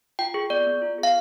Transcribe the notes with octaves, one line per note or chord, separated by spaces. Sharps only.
F4 G5
G#4
B3 D5
B3
F4
G#4
F5